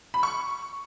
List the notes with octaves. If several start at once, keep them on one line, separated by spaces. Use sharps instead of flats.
B5
C#6